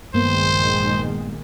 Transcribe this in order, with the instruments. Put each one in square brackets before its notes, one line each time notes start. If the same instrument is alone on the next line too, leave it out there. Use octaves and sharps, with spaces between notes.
[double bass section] A#1 D#3 G#3 [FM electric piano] G2 A#3 B3 [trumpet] C5